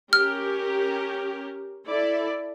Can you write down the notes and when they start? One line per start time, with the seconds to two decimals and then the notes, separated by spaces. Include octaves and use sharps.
0.13 C#4 G4 A#4 F6
1.88 E4 A4 D5